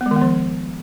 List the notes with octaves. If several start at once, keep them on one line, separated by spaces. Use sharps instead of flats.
B3
G#3
D#3
B3
F3